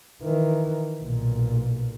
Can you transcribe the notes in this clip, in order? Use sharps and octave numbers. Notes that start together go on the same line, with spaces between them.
D#3 E3
B1 A#2